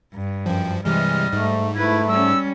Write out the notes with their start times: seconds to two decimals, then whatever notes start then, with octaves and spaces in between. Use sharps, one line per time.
0.14 G2
0.46 F#2 F3 G5
0.85 C3 E3 G3 G#3 D#5 F6
1.33 G#2 A3
1.75 A3 E4 B4 G#6
2.07 G3 C#4 E6